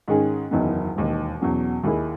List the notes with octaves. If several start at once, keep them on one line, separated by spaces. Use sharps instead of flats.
G#2 D#3 G#3 C#4 G#4
F#1 E2 D#3 F#3 B3
E1 D#2 D#3
E2 B2 F#3 C#4
D#2 D#3 A#3 E4 G#4